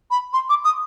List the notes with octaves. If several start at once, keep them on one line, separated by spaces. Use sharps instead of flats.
B5
C6
D6
D#6